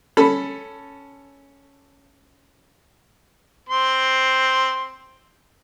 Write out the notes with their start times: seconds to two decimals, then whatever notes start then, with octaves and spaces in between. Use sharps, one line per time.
0.17 C#4 A4 B5
3.69 C4 C6